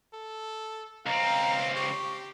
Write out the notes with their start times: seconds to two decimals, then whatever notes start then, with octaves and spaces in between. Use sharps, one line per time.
0.13 A4
1.06 C#2 C4 F5 A#5
1.75 G4 C#6